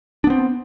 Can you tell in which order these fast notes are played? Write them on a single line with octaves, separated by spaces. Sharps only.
D4 B3 C4